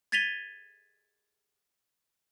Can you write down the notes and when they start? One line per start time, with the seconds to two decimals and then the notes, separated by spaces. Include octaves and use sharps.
0.12 G#6 A6 B6 D#7 F7 G7